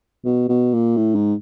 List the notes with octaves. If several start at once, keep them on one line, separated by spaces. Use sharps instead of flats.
B2
B2
A#2
A2
G#2